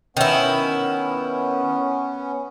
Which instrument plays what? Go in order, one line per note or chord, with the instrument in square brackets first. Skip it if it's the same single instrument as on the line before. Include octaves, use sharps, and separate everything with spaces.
[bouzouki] D#3 E4 [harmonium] B3 C#4